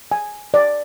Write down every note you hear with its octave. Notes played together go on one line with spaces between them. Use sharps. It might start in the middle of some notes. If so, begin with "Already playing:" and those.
G#5
D5